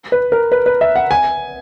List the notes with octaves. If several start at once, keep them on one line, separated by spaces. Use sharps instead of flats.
B4
A#4
B4
B4
E5
F#5
G#5